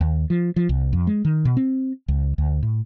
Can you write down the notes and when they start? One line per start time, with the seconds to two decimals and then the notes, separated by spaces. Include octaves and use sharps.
0.01 D#2
0.30 F3
0.56 F3
0.69 C2
0.93 F2
1.07 G#3
1.25 D#3
1.45 B2
1.57 C4
2.08 C#2
2.38 D2
2.63 A2